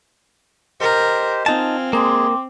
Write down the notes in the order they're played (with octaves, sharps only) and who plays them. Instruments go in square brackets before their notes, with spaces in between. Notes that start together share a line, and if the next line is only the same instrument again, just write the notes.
[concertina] G4 C5 [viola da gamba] A#4 [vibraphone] D#5
[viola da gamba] C4 [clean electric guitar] D#4 A5 [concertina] F4 G#5 F6
[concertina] G#3 G#4 [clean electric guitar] A#3 [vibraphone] G5 C6 D6